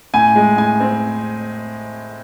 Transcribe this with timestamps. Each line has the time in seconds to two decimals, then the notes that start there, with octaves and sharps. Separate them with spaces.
0.14 A2 G#5
0.36 G#3
0.58 A2 G#5
0.80 C4